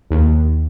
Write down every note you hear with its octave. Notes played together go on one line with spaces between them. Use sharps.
D#2